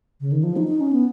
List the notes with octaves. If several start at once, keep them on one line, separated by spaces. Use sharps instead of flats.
C#3
D#3
F3
D#4
D#4
C#4
B3